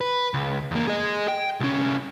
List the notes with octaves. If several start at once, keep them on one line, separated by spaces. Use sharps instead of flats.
B4
C#2
E2 A#3
G#4 D#5
G5
C2 C#4